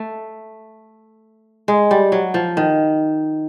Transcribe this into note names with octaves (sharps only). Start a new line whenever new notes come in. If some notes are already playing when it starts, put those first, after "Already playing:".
Already playing: A3
G#3
G3
F#3
F3
D#3